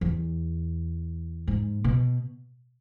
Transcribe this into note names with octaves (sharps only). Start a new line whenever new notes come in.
E2
G#2
B2